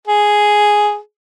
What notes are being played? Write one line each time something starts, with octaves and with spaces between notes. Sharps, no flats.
G#4